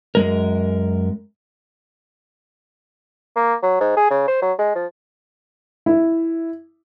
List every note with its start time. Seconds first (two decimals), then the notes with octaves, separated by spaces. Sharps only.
0.15 F#2 G#3 A#4
3.36 A#3
3.63 F#3
3.81 G#2
3.97 G#4
4.10 C#3
4.28 C5
4.42 F#3
4.59 G#3
4.75 F3
5.86 E4